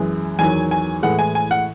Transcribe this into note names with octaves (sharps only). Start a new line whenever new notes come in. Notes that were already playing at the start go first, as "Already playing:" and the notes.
Already playing: F#2 E3 G#3
E2 D#3 F#3 G#5
G#5
A2 E3 G#3 F#5
G#5
G#5
F#5